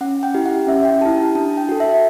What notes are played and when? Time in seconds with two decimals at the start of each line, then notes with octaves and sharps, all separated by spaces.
0.01 C#4 F#5
0.23 G5
0.34 E4 G4
0.46 F#5
0.67 C#4 E5
0.85 G5
1.01 G4 A5
1.05 E4
1.18 A5
1.35 D4 A5
1.57 G5
1.69 F#4 A4
1.80 E5